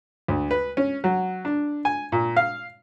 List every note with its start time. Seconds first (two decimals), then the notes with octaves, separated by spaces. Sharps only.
0.28 D2
0.51 B4
0.77 C#4
1.04 F#3
1.45 D4
1.85 G#5
2.12 A#2
2.37 F5